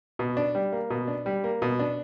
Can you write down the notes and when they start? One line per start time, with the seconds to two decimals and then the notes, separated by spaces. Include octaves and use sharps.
0.19 B2
0.37 D4
0.55 G3
0.72 A#3
0.90 B2
1.08 D4
1.26 G3
1.44 A#3
1.62 B2
1.79 D4